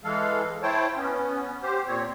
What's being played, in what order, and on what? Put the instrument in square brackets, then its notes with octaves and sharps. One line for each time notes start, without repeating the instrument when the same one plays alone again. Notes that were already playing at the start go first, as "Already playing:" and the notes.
[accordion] E3 G#3 A4 F5
E4 C5 C#5 G5 A5
B3 C#4
G4 C5
A#2 C4 C#5